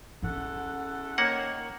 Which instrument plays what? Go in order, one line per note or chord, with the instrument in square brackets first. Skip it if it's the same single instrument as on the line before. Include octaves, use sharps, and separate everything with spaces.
[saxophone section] E2 A4 F#5 [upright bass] C#4
[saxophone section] D#3 C#5 [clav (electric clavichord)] A#3 F#5